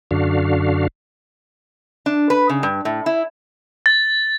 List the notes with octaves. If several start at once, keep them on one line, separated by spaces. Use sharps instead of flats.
F#2 D3 D4 F#4 F5
D4
B4
C#3
G2
A2
E4
A6